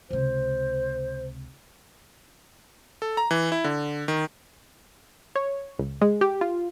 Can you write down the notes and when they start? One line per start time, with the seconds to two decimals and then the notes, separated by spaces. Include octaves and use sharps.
0.11 C#2 C3 C5
3.02 A4
3.17 A#5
3.31 E3
3.52 E4
3.64 D3
4.08 D#3
5.36 C#5
5.79 C#2
6.01 G#3
6.21 G4
6.41 F4